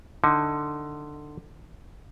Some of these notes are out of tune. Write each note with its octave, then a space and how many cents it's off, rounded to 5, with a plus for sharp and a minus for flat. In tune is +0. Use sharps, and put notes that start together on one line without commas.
D3 +15 D#4 +25